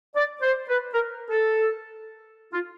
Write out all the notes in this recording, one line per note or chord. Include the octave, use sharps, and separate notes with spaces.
D5
C5
B4
A#4
A4
F4